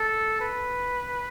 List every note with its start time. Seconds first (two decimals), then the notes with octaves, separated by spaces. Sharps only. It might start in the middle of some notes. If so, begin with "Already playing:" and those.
Already playing: A4
0.40 B4